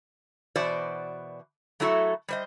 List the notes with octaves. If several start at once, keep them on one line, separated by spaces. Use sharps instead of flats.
B2 E3 F#4 C5 D5
F#3 A3 E4 F#4 A4
G3 C5 D#5